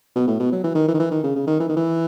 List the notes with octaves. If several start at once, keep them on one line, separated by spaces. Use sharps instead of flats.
B2
A2
B2
F#3
E3
D#3
E3
D#3
E3
D#3
C#3
C#3
D#3
E3
D#3
E3